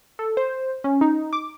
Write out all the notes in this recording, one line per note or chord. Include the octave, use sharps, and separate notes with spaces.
A4
C5
C#4
D#4
D6